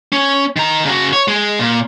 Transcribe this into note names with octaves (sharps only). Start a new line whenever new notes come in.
C#4
D#3 A#5
C#3 F#4
C#5
G#3
A#2